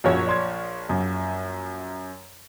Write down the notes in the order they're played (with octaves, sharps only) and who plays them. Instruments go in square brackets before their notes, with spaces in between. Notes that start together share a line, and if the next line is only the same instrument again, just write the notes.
[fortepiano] A#1 F3 C#5 [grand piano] F#2 F#3
[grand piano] D5 C6 G#6
F#2